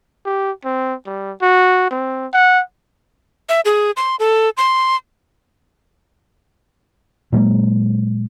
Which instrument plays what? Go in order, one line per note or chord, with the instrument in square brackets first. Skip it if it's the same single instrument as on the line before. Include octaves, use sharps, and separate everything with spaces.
[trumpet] G4
C4
G3
F#4
C4
F#5
[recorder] E5
G#4
C6
A4
C6
[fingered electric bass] A#2 F#3 G#3 A#3